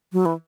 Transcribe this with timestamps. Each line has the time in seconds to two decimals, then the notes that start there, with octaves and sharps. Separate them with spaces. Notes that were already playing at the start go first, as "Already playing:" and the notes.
0.13 F#3
0.26 E3